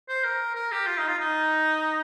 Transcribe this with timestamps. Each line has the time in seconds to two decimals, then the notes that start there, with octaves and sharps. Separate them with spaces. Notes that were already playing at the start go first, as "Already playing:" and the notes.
0.09 C5
0.24 A#4
0.55 A#4
0.72 G4
0.87 F4
0.97 D#4
1.07 F4
1.19 D#4